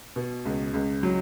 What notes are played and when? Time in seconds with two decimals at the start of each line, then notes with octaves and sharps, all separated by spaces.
0.16 B2
0.45 C#2
0.74 C#2
1.03 F#3